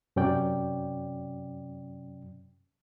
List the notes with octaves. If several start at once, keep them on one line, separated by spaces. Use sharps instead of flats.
F#2 C3 F#3 C#4 D5 G5